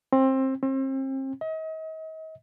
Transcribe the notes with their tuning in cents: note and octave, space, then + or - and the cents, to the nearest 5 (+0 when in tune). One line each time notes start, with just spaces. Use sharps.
C4 +20
C4 +35
D#5 +40